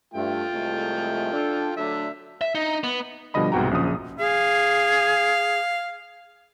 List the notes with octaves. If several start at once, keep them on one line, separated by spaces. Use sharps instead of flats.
G2 A3 F4 G5
C2 G#3 A3
D4 A4
D3 F#3 A3 D4 E5
E5
D#4
B3
B2 D3 F3 G3 D#5 B5
C2 G#2 B2 F#4 G5 A#5
A#1 F#2 C#3 F3 D#6
G#4 F5